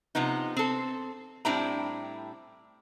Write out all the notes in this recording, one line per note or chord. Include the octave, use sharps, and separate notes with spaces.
C3 F3 B3 D#4
C4 A4
A2 G3 C4 D4 E4 A#5